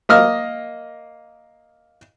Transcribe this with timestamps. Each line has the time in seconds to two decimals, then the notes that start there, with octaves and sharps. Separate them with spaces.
0.09 A#3 D#5 F6